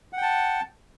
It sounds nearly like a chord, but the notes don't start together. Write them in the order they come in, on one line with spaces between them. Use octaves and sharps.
F#5 G5 A5